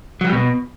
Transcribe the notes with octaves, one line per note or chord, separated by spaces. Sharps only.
F#3
G3
B2